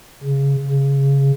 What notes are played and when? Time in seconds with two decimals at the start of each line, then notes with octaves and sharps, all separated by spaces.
0.24 C#3
0.68 C#3